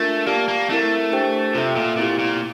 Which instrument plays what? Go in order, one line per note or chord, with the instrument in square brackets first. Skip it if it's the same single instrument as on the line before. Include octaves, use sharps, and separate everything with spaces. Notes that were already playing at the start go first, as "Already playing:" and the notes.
Already playing: [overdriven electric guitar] A3 [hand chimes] D4 F4 A#4
[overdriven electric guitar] A#3 [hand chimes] G4 D5 A5
[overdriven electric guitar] A#3
[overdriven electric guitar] A3 [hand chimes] C4 E4 A#4
[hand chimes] D4 G4 C5 G5
[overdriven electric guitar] C3 [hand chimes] F4 A4 E5
[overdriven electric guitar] A#2
[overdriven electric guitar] A#2 [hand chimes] C4 E4 G4
[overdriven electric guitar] A#2